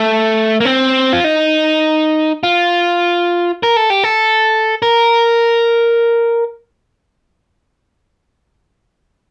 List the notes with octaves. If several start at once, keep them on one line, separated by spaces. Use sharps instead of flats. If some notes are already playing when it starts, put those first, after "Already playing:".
Already playing: A3
A#3
C4
F4
D#4
F4
A#4
A4
G4
A4
A#4